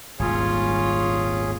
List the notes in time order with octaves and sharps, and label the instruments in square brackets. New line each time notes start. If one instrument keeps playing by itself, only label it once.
[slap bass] D#1 G#1 [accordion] C#4 G#4 C#5 [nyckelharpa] F4